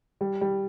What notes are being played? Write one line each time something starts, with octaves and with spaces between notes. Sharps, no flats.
G3
G3